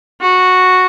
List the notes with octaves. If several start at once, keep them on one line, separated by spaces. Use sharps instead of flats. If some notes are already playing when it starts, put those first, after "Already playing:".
F#4